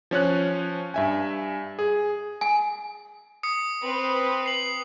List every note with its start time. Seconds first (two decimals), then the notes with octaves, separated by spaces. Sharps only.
0.11 F3 C#4 C#5 F#6
0.94 G2 E5 G#5
1.79 G#4
2.41 G#5
3.43 D#6 C#7
3.82 C4 B4
4.46 C7 F#7